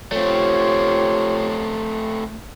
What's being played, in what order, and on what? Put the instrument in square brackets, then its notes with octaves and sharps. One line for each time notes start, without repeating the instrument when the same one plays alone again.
[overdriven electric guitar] A3 C4 [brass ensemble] F4 G4 C#5